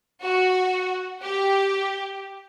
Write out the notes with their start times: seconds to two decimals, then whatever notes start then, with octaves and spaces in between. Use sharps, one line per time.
0.22 F#4
1.22 G4